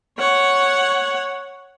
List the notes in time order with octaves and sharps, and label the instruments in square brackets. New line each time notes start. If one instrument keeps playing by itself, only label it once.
[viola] C#5 F#5